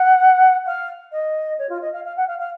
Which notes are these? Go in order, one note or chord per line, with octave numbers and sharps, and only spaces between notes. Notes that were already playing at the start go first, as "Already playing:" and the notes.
Already playing: F#5
F5
D#5
C#5
F4
D#5
F5
F5
F#5
F5
F5